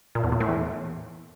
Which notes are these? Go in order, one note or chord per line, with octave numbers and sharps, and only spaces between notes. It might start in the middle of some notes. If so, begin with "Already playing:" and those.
A#2
E2
A#2
A2
E2